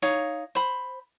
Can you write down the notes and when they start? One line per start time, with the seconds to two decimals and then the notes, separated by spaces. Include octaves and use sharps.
0.02 D#4 C#5 F5
0.55 C5 B5